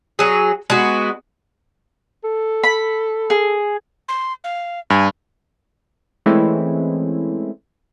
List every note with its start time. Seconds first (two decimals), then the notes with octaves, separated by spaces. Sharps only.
0.19 F#3 G#4
0.70 G#3 B3 F#4
2.24 A4
2.64 B5
3.30 G#4
4.09 C6
4.44 F5
4.90 G2 G#5
6.26 E3 G#3 A3 C4 C#4 E4